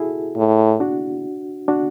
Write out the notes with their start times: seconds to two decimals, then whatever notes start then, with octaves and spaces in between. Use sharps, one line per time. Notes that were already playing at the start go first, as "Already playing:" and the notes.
Already playing: E4 F#4 G#4 A4
0.37 A2
0.80 D4 F#4
1.68 D4 F#4